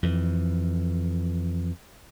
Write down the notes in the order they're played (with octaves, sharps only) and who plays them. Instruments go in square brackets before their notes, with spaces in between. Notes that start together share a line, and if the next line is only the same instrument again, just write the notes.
[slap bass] F2 E3